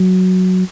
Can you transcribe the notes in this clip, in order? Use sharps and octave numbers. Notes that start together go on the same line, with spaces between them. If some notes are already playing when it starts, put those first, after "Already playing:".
Already playing: F#3